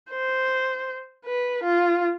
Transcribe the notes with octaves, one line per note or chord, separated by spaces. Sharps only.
C5
B4
F4